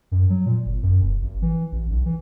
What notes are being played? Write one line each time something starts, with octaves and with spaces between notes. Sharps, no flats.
F#2
F#3
A#2
G1
F#2
F1
G#1
E3
A1
B1
E3